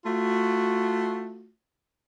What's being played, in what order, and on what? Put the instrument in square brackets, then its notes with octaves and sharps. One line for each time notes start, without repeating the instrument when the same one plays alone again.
[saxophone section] A3 F4 F#4